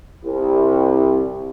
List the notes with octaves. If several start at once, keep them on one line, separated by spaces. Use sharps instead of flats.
C2